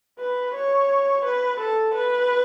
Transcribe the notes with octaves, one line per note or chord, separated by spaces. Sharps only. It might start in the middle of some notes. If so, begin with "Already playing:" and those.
B4
C#5
B4
A4
B4